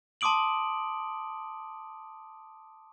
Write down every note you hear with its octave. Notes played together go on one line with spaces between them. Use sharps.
A5 C6 D6 D#6 D7 F#7